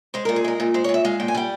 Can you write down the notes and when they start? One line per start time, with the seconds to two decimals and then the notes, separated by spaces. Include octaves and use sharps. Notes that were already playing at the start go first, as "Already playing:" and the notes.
0.14 G#3 C5
0.25 A#2 A#4
0.36 G#4
0.44 G#3 A#4
0.60 A#2
0.74 G#3 C5
0.84 C#5
0.89 A#2
0.94 E5
1.05 G#3 F5
1.20 A#2 G5
1.28 G#5
1.35 G3 G5